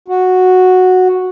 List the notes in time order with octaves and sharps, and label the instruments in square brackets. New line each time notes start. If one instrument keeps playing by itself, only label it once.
[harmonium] F#4